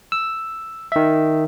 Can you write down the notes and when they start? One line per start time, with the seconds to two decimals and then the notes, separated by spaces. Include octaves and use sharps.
0.12 E6
0.92 D#3 E5